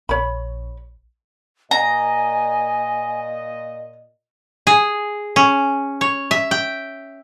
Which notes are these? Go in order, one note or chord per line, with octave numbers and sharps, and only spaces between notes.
A#1 C#5 B5
A#2 D#5 G#5 A#5
G#4
C#4
C#5
E5
G5